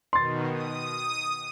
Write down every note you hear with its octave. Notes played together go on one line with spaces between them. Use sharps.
B2 D#3 C6 A6
D#6